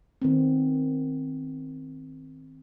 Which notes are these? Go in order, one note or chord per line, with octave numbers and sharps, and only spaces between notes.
D#3 B3 C4